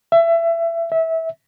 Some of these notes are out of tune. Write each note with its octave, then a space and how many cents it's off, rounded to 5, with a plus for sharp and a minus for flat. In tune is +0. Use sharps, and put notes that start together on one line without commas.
E5 +25
E5 -20